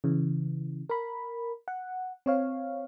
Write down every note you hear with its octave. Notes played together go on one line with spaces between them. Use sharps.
C#3 E3
A#4 B5
F#5
C4 C#5 F5